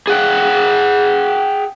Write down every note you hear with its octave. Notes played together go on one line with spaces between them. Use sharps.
G#4 F#5 G5